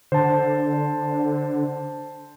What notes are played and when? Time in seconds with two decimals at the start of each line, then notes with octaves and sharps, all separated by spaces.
0.12 D3 C5 A5